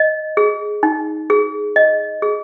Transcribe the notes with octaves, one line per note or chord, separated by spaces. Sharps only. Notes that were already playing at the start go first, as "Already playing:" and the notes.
Already playing: D#5
G#4
D#4
G#4
D#5
G#4